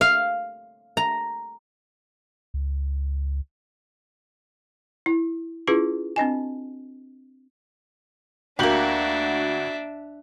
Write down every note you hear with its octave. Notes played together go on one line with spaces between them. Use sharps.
F5
A#5
C#2
E4
C#4 E4 F4 G#4 B4
C4 D4 D#5 G#5
D2 A#3 D4 F#4 G4 E5 F#7